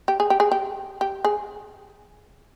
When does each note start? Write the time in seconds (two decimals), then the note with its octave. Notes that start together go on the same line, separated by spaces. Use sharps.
0.08 G4
0.20 G#4
0.30 G4
0.40 G#4
0.52 G4
1.01 G4
1.25 G#4